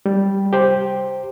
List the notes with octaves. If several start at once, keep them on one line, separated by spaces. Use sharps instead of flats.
G3
G4 C5